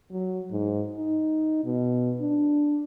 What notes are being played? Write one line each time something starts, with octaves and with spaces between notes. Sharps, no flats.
F#3
G#2
D#4
B2
D4